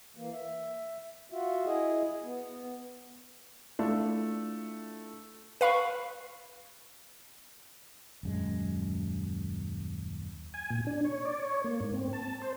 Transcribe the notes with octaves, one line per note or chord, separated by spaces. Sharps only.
E3 A#3
E5
F4 F#4 E5
E4 G#4 D#5
B3
A3 D4 E4 F4
B4 F5 B5 C#6
D#1 F#2 G#3
G#5
A#2
D4
C#5
D5
C#5
A#3
G#2
C4
A5
C5